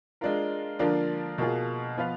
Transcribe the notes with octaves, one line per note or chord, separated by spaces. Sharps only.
G#3 D4 F4 A#4
D3 F3 A#3 D4 F4
B2 A#3 F4 G#4
F3 B3 F4 B4 F5